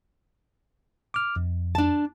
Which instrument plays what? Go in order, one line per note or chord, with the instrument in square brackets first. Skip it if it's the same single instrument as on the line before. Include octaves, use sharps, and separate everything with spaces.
[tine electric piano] D6 F6
F2
[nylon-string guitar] D4 A5